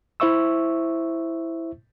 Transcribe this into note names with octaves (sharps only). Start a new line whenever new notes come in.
E4 C5 E5 C#6 E6